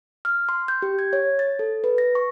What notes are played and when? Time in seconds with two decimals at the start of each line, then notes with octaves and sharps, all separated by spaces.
0.25 F6
0.49 C6
0.68 G6
0.82 G4
0.99 G#6
1.13 C#5
1.39 A6
1.59 A4
1.84 B4
1.98 A#6
2.15 C#6